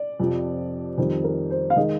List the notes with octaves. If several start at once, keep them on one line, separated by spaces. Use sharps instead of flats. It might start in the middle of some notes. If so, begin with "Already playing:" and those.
Already playing: D5
F2 C3 F3
F2 D#3 G3 C5
A#4
C5
F5
D#3 G#3 D#5